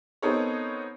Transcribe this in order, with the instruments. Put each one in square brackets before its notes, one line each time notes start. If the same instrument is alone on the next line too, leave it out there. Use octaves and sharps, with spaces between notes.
[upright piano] B3 C4 D#4 A4 A#4 C#5